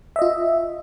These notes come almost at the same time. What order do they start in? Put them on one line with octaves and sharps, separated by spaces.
E5 D#5 F4